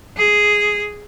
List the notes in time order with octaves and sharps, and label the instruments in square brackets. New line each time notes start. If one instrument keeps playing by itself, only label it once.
[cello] G#4